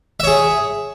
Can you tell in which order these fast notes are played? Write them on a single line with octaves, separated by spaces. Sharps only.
E5 C#5 G#4